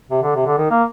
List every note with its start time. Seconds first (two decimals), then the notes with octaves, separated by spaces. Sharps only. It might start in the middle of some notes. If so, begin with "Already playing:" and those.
0.10 C3
0.23 D3
0.35 C3
0.46 D3
0.58 D#3
0.70 A#3